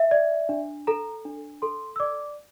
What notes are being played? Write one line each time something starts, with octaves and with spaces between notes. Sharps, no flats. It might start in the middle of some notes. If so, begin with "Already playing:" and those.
Already playing: E5
D5
D4
A4 A#5
D4
A4 C6
E6
D5 D6